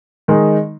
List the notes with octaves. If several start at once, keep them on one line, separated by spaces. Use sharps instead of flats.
D#3 G#3 D#4